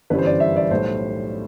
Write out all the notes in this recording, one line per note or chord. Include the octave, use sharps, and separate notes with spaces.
G1 F#2 E3 G3 B4
C5
D5
E5
D5
B1 A2 G3 C5